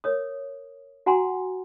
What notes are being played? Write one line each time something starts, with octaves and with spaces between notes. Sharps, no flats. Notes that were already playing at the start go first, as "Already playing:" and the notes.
A#4 C#5 D#6
F#4 F#5 G#5 A#5 C6